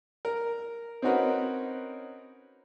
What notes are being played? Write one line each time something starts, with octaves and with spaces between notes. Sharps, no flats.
A#4
C4 C#4 D#4 F#4 A#4 B4